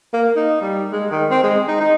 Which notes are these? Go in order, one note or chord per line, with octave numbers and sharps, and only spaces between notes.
A#3
D#4
G3
G#3
D#3
C4
G#3
D#4
D#4